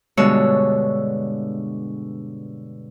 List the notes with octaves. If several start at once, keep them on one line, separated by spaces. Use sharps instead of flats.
G2 B2 D3 G#3 C#5 E6